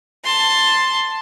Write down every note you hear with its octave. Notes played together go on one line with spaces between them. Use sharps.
A5 C6